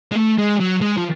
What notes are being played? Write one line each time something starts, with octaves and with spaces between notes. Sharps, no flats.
G#3
A3
G#3
F#3
G#3
F3